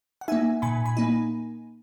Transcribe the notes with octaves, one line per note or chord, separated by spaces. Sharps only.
F#5
A#3 D#4 E5 G#5
A#2 G#5 B5
G#5 B5
A#3 D#4